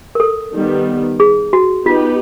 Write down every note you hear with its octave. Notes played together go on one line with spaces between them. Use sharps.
A#4
A4
D#3 G3 B3
G#4
F#4
B3 D#4 F4 G4 B4